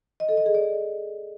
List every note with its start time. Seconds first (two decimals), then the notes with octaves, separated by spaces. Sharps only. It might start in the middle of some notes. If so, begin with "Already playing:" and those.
0.20 D#5
0.29 A4
0.37 D#5
0.46 G#4
0.55 D5